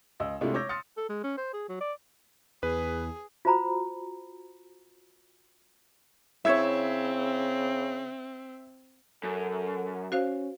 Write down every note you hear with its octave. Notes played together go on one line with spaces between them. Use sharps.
C#2 D#5 E6
C3 G#3 A3 D4 E4 F4
C#5 D6 E6 G6 A#6
C6 D#6 F6 A6 C#7
A4
G#3
C#4
C5
G#4
F#3
D5
E2 G#4 B4
F4 F#4 C5 A#5 B5
C#3 C4 E4 C#5 E5 E6 G#6
F#2 A4
C#4 F#4 C5 F5